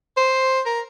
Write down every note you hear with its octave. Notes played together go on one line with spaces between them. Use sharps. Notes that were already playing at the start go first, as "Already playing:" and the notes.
C5
A#4